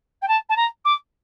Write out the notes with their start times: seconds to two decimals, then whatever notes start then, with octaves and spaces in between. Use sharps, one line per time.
0.22 G5
0.28 A5
0.49 A5
0.56 A#5
0.85 D6